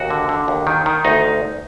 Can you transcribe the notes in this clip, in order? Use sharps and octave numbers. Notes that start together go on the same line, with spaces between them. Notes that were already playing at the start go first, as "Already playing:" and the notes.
Already playing: D#2 F#4
D3
D3
D#2
D#3
D#3
D2 D#4